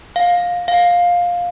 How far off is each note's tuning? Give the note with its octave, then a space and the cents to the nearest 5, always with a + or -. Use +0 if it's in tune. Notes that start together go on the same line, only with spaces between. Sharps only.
F5 +20
F5 +15